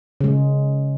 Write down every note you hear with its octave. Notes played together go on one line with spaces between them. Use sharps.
C#3 G#3